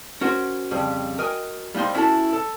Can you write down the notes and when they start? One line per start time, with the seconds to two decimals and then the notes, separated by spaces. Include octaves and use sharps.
0.21 C#4 F#4 A#4 C5
0.71 F2 C#3 G3
1.18 F#4 A#4 D#5 G5 G#5
1.75 G3 A#3 D#4 C5 C6
1.95 C#4 E4 F#4 A4
2.33 A4